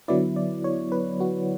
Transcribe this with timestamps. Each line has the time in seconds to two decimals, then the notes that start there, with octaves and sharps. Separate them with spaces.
0.08 D3 F#3 B3 E4 D5
0.36 D5
0.64 C#5
0.92 B4
1.21 F#4